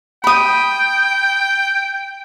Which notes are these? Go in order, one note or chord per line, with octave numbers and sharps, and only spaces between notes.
G5 B5 D#6